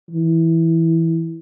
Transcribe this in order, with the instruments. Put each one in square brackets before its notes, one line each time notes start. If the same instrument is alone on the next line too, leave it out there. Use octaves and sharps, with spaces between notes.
[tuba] E3